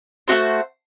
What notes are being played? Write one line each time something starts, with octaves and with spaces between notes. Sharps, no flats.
A3 D4 F#4 C5